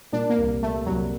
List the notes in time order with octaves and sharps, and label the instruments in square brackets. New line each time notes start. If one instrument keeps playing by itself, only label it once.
[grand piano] A#2 [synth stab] D4
[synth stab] A#3
[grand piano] C2
[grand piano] G3 [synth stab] A3
[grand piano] C2 [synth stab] F#3